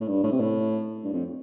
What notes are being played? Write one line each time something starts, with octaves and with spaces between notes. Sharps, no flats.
A2
G2
A2
C3
A2
G2
F2